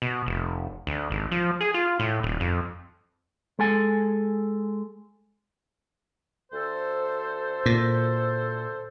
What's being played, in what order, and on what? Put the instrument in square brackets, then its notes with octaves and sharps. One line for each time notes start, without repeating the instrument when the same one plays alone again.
[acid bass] B2
F1
D2
G#1
F3
G#4
F4
A2
D#1
F2
[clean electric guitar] G#3 A4 G#5
[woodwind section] D2 A4 C5
[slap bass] A#2